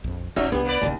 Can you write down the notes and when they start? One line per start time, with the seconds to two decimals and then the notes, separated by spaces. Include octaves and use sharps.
0.04 A#1 F2
0.36 D1 A1 C4 C#4 D#4 F#4 E5
0.52 C2 B3 D4 G4
0.65 A#3 B4 D5
0.81 E1 A1 D#2 C#3